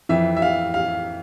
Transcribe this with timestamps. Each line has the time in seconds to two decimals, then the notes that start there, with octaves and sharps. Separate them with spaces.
0.09 F2 E3 E5
0.37 E5
0.42 F5
0.74 F5